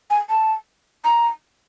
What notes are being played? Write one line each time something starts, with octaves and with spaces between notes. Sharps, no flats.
G#5
A5
A#5